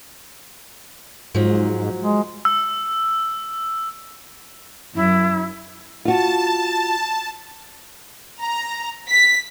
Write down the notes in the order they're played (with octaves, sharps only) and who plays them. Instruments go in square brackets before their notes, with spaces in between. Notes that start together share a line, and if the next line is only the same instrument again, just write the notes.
[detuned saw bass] G#2 [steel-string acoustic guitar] F3 F#3
[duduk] G#3
[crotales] E6
[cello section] F#2 [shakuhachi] E4
[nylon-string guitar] F4 F#4 [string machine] A5
[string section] A#5
B6